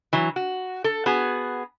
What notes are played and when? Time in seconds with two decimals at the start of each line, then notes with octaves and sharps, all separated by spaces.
0.13 E3 F#3
0.36 F#4
0.84 A4
1.06 B3 F#4 G#4